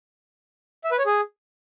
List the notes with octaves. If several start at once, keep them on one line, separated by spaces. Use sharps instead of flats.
E5
B4
C#5
G#4